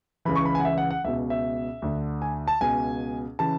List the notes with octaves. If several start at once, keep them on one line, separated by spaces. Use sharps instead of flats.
C#2 C#3 E3 B5
C#6
B5
G#5
F#5
E5
F#5
F#5
C#2 B2 E5
E5
D2 D3
G#5
A5
C#2 B2 G#5
C#3 E3 A5